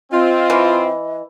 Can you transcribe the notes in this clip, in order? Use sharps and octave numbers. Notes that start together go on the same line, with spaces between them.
C4 F4 D#5
E3